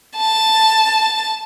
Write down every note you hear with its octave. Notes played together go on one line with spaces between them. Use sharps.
A5